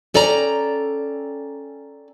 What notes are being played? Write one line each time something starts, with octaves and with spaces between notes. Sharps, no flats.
C#4 A4 D5 G5 A#5